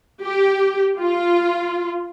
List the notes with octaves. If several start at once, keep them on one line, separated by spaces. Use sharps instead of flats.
G4
F4